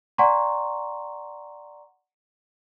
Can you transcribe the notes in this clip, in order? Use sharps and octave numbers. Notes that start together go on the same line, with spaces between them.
D5 F#5 G#5 A#5 C6 C#6